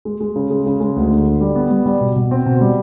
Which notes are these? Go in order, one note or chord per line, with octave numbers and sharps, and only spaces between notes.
G#3
G#3
C#3
G#3
C#3
G#3
D2
D3
D3
G3
B3
G3
G3
B2
B2
C4
B2
G3